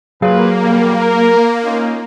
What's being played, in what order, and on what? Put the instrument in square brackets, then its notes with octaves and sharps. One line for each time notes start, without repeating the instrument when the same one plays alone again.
[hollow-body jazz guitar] F#3 G#4 F5 [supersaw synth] A#3 [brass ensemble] F4 B4
[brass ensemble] B2 D3 G3
A#4
C#4 D#4 F4